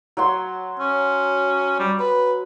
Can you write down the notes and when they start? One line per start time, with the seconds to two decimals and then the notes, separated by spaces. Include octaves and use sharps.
0.17 F#3 F#4 C6
0.79 C#4
1.79 G3
1.99 B4